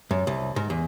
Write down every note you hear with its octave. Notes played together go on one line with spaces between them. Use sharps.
F#2
C2
G#2
E2